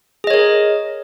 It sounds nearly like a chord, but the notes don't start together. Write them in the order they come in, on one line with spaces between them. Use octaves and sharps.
G#4 D#5 C#5 A#4